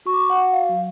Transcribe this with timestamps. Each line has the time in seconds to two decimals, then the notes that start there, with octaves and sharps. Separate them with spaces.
0.06 F#4 C#6
0.13 D6
0.21 C#6
0.30 F#5
0.38 F#4
0.53 F5
0.69 F#3